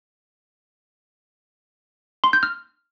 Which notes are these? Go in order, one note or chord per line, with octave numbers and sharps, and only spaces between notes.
C6
G6
F6